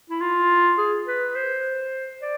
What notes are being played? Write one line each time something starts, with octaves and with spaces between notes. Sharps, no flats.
E4
F4
G#4
B4
C5
D5